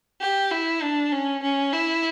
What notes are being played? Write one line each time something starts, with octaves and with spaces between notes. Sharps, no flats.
G4
E4
D4
C#4
C#4
E4